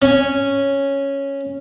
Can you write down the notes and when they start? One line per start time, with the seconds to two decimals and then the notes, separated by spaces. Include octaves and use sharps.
0.02 C#4 G#5